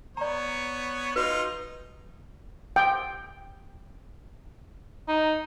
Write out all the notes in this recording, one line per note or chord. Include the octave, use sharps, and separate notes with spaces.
B3 C#5 D5 A#5
D#4 F4 F#4 B4
G5
D#4